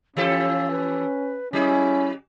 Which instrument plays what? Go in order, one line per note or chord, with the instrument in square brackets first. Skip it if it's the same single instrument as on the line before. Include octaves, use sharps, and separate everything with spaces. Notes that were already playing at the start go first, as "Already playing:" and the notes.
[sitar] E3 G4 A4 [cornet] C#4 [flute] F5
[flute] B4
[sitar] F#3 G#4 [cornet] C#4 [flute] E4